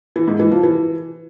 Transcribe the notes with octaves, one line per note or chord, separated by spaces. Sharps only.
E3
G#2
E3
F3
E3